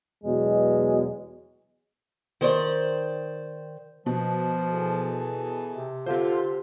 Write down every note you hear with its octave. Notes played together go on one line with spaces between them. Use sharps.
E2 B2 F#3 G#3
D#3 C5 D5
B2 F3
E3 G#4 A4
C3
D3 F4 G4 C5